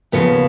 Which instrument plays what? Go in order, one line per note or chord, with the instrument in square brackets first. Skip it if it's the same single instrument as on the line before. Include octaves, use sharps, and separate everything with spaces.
[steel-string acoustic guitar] D#2 C#3 F3 B3